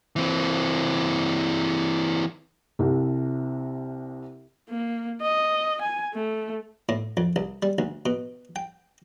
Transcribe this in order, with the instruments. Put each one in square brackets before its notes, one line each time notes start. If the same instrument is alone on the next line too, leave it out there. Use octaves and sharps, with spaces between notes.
[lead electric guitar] E3 C4
[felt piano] C2 C3
[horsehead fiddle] A#3
D#5
G#5
A3
[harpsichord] A2
F2
C2
G3
D2
B2
G5